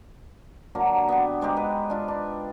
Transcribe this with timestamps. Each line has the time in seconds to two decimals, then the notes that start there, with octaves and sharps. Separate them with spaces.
0.75 D3 F#3 A#3
1.08 B3 D4 G4
1.41 G#2 G#3 D#4 G4
1.57 B4
1.90 D4 F4
2.08 D4